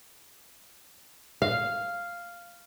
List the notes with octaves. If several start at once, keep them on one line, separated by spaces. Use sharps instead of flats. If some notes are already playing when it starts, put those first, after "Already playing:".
F5